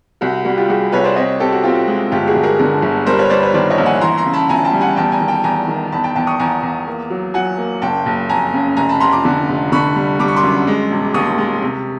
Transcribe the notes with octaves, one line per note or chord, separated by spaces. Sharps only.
C2 F#4
G3 F#4
F4 G4
G3 F#4 G#4
C2 B4 C#5
C5 D5
C4 C#5 D#5
C4 G4 A4
F#4
C4 F4 G4
G#3
G1 F4 G4
F#4 G#4
G1
G#4 A#4
D3 G#4 A#4
G1
G3 A#4 C5
B4 C#5
G3 C5 D5
B4 C#5
D#3 C5 D5
C#5 D#5
A#1
F#5 G#5
E3 A#5 C6
A#5 C6
C#3
A5 B5
D2 G#5 A#5
G5 A5
G3
F#5 G#5
E2 G5 A5
G#5 A#5
D#3
G5 A5
E2 G#5 A#5
D#3
E2 A5 B5
G5 A5
E2 G5 A5
C#6 D#6
E2 G#5 A#5
E2
A#3
F#3
F#3 F#5 G#5
A#3
F#1 G5 A5
F#1
F2 G#5 A#5
C#3
F1 G#5 A#5
A5 B5
F1 A#5 C6
C6 D6
D3
F1
D3 B5 C#6
G3
G3 D6
C#6
C6 D6
F#2
G#3
E1
D#2 C#6 D#6
G#3
C3